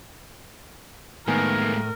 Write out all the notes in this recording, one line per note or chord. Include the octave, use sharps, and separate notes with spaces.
A2 D#3 G#3 A#3 B3 A#4 G#5